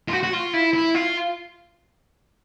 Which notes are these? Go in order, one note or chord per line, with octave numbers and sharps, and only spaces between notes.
F4
F#4
F#4
F4
E4
E4
F4